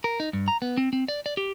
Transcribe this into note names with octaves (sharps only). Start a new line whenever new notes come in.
A#4
D#4
G2
A#5
B3
C4
C4
D5
D5
G4